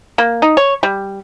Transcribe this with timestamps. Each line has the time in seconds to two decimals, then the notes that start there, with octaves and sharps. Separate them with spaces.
0.18 A#3
0.42 D#4
0.57 C#5
0.83 G3